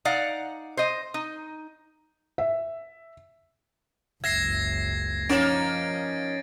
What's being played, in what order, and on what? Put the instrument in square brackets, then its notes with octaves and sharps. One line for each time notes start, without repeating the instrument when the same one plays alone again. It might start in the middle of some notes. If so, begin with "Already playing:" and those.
[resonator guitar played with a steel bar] D#4 D5 F5 F#5
C5 D#5
D#4
[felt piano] E5
[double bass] F#1 C#2 [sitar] E5 [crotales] G#6 A#6 C7
[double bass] F3 [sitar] A#3 D#4 [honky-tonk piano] C#4 [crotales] A6 D7